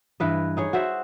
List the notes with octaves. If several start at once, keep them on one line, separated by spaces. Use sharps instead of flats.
G2 E3 B4 D#5
D#4 G#4 C#5
F#4 C5 E5